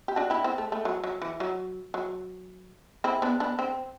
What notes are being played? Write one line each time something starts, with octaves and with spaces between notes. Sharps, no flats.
G4
D4 F#4
E4 G4
C4
A3
A3
F#3
F#3
E3
F#3
F#3
C4 E4
B3 D4
B3 D4
C4